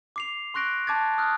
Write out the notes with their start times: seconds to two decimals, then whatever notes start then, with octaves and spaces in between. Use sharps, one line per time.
0.16 D6 C7 F7
0.54 C6 C#6 F#6 A#6 D7
0.87 A5 D6 G#6 A6
1.18 D#6 F6 F#6